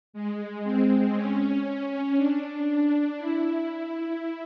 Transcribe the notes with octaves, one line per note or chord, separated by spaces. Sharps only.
G#3
C4
C#4
D4
E4